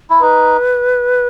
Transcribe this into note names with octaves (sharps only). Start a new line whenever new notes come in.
E4
D#4 B4